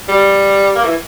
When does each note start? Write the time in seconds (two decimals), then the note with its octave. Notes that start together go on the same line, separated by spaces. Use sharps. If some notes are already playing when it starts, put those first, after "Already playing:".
0.08 G3
0.75 A#3
0.84 E3